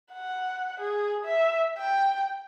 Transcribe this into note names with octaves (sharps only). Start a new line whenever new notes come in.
F#5
G#4
E5
G5